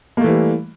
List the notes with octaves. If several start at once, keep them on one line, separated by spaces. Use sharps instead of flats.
E3 G3 A3 A#3